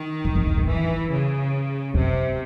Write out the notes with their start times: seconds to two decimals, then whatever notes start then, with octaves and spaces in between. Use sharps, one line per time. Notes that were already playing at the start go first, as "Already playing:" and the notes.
Already playing: D#3
0.25 F#2
0.35 F2
0.46 E2
0.57 G#2
0.67 F2 E3
1.10 C#3
1.94 F#2 C3